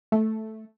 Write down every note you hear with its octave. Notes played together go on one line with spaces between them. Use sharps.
A3